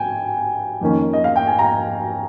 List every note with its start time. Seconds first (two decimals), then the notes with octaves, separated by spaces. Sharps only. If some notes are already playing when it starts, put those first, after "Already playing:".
Already playing: G5 G#5
0.81 F2 D#3 A#3 C#4
1.13 D#5
1.24 F5
1.36 G5
1.47 G#5
1.59 A#5